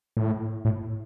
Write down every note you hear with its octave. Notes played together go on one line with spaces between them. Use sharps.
A2
A2